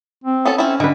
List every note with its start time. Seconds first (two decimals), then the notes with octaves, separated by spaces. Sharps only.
0.24 C4
0.45 B3 C#4 A4
0.58 C4 C#4 E4
0.80 D3 G#3 B4